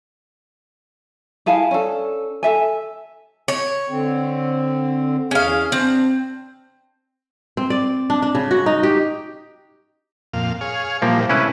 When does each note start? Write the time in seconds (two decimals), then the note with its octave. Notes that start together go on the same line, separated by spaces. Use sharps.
1.46 E4 G#4 F5 A5
1.71 C#4 D4 A4
2.43 A4 E5 G#5
3.48 C#5
3.89 D3 C4
5.31 E2 C#4 G#4 F5
5.72 C4 D4 C5
7.57 C4
7.70 D5
8.10 D4
8.22 D4
8.35 C#3
8.51 F#4
8.66 D#4
8.83 G4
10.33 F2 A#2 F5
10.61 G#4 C#5 F5
11.02 A#2 E3 F3 G3 A#3
11.29 C3 G#3 A3 C#4 E4 B4